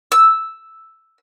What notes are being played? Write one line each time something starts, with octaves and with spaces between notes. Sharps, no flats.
E6